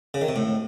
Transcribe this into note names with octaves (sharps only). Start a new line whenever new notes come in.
C#3
D#3
C3
A2